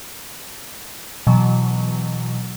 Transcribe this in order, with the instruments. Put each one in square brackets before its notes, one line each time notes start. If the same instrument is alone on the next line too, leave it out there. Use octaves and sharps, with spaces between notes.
[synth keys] B2 E3 F#3